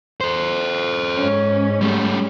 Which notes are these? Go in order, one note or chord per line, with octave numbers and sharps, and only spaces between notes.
A4 C5
G#2 C#4
G3 A3